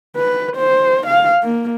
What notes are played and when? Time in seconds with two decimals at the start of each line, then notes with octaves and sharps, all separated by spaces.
0.16 B4
0.56 C5
1.07 F5
1.43 A#3